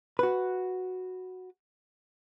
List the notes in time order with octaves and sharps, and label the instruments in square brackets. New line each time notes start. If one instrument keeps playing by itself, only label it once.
[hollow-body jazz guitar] F#4 B4